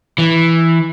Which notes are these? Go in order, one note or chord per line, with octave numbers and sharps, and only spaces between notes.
E3